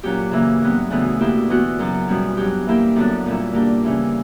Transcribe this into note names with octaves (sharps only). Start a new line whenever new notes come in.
A#2 F#3 C#4 G4
C#3 E3 A#3
G2 F#3 B3
D2 C#3 E3 B3
B2 A#3 E4 G4
E3 B3 F#4
F#2 C#3 F#3
E2 B2 G3 C#4
G2 F#3 C#4 G4
E3 G3 A#3 E4 G4
F#2 D3 F#3 B3 D4
A#2 G3 C#4 E4
D3 A#3 D4 G4
C#3 E3 G3 C#4